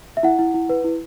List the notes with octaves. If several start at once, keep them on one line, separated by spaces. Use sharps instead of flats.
E5
E4 F#5
E4
E4
B4
E4